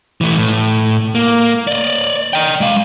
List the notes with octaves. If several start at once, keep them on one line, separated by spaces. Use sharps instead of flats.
E3 A3
A2
A#3
D5 D#5
D#5 G5
G#3 F5